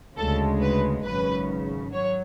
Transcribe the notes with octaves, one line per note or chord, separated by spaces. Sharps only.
D2 C#3 G#3 A4
B4
G#1 F#2 C#3 B4
F#3 C#5